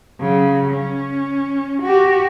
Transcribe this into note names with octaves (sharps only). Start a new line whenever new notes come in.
C#3 F#3
C#4
F#4 G4